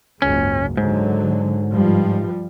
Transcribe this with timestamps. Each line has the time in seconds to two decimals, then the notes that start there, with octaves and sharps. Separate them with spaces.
0.22 F#1 C#2 G#2 C#4
0.77 G#2 D3 F#3
1.72 G2 F3 G3